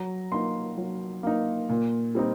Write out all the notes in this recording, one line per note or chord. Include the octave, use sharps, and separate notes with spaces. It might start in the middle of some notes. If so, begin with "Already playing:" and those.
Already playing: F#3 A#5
A#3 D#4 C6
F#3
A#3 D#4
A#2
G3 C4 D#4